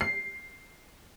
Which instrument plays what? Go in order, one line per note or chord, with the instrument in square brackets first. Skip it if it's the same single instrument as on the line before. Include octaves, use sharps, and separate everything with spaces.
[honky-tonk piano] C7